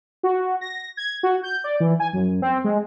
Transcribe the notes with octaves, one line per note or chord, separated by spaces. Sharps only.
F#4
A#6
G#6
F#4
G6
D5
E3
G#5
F#2
C4
G#3